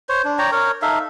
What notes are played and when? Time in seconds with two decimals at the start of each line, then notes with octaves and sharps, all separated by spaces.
0.09 C5 C#5
0.25 D4
0.39 C#5 D5 G5 A#5
0.52 A#4 C#5
0.82 D#4 A4 E5 F5